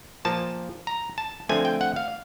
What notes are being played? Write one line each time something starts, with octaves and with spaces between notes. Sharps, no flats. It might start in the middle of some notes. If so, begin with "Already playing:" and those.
A#2 F3 A#3 A5
A#5
A5
D3 F3 A3 C4 G#5
G5
F#5
F5